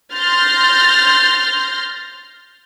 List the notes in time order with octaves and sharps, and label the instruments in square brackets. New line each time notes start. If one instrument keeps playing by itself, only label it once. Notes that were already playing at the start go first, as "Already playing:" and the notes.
[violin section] C6 F6 G6 A6 A#6